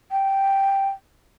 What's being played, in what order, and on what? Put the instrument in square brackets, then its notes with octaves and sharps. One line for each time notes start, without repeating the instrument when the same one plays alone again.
[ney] G5